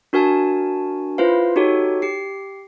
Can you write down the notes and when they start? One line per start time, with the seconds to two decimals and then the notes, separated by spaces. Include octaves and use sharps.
0.13 D4 F#4 A#4 G#5 A5
1.18 E4 F4 B4 C5 F5
1.56 D#4 F#4 G4 A4 C#5
2.02 G4 C7